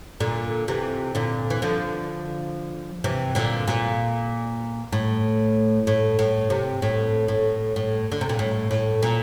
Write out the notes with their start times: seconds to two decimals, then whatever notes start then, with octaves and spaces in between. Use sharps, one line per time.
0.20 A#2 D3
0.68 C3 E3
1.15 A#2 D3
1.50 E3
1.62 D3 F3
3.04 C3 E3
3.35 A#2 D3
3.68 A#2
4.92 A2
5.87 A2
6.19 A2
6.50 C3
6.82 A2
7.28 A2
7.76 A2
8.12 D3
8.21 C3
8.29 A#2
8.39 A2
8.71 A2
9.02 A#2